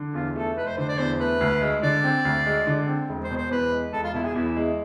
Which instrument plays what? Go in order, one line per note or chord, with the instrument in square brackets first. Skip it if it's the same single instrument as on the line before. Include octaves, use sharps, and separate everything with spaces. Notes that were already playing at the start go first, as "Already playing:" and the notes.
Already playing: [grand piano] D3
[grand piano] E2 [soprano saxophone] F4
[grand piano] A3 [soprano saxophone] A4
[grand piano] F1 [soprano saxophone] B4
[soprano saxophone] C5
[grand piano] D3 [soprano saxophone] C5
[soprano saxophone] D5
[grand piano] E2 [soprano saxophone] C5
[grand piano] A3 [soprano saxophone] B4
[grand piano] D2
G#3
[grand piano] D3 [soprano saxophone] D5
[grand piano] C4
D2
G#3
D3
C4
E1
[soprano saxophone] C5
[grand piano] B2
[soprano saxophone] C5
[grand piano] E2 [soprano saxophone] B4
[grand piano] G#3
[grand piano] E1 [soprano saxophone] A4
[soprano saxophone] F4
[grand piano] B2 [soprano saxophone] E4
[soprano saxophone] G#4
[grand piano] E2 [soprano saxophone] E4
[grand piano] G#3